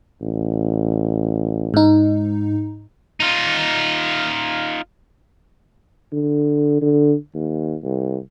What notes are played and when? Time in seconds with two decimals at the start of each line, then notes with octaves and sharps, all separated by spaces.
0.22 A1
1.74 G#2 D#4
3.20 D#4 F4
6.12 D3
6.82 D3
7.34 D#2
7.84 C2